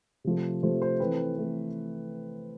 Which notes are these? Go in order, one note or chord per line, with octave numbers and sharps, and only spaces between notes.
C3 F3 A3
C3 F3 A3 C5
C5
E3 A3 C4 B4
E3 A3 C4